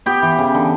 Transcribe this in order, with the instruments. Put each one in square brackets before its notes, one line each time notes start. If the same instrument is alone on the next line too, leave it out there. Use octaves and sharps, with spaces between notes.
[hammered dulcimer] B3 G4
E3
C#3
D3